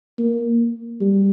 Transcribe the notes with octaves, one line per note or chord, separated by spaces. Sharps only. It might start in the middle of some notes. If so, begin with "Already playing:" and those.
A#3
G3